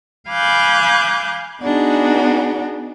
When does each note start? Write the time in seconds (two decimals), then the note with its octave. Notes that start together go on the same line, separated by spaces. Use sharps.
0.28 F5 G#5 B5 D6 F#6 G6
1.61 B3 D4 D#4 F#4 G#4